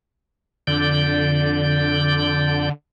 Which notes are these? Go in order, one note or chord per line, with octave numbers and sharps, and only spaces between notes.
F2 D3 D5 G6